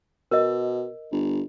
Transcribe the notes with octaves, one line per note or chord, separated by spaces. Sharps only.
B2 A#4 D#5
G1